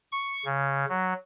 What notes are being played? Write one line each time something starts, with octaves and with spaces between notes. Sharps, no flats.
C#6
C#3
F#3